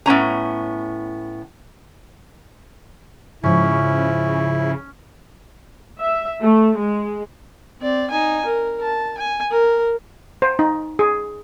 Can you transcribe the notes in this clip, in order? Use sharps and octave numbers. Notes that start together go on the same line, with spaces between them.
A2 B3 C#4 A#5
G#2 C#3 F3 C#4 E4
E5
A3
G#3
C4 D5
D#4 G#5
A#4
A5
G#5
A#4
C5
D#4
G#4